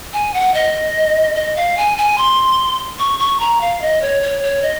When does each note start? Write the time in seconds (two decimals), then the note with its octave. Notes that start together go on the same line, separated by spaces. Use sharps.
0.13 G#5
0.34 F#5
0.54 D#5
1.35 D#5
1.56 F5
1.77 G#5
1.98 G#5
2.18 C6
2.99 C#6
3.19 C#6
3.40 A#5
3.61 F5
3.82 D#5
4.02 C#5
4.23 C#5
4.43 C#5
4.63 D#5